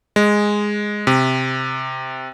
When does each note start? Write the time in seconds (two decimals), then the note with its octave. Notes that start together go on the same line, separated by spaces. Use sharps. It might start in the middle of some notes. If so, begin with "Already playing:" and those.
0.16 G#3
1.07 C3